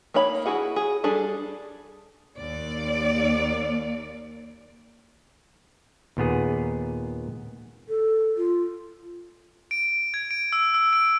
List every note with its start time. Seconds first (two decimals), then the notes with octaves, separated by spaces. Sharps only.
0.14 A#3 D#4 C#5 B5
0.46 E4 F#4 G#4 F#5
0.76 G#4
1.04 G3 D4 G#4 A4
2.38 D#2 D5
6.17 D#2 A#2 B3 G#4
7.89 A4
8.37 F4
9.71 D7
10.14 G#6
10.31 D7
10.53 E6
10.74 E6
10.93 D7